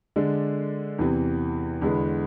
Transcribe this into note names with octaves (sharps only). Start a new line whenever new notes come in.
D3 G#3 D4
E2 C3 E3
E2 D3 G#3 B3